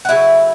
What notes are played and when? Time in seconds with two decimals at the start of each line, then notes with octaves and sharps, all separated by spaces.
0.05 F#5
0.09 C#3 F#3 A3 E4 E5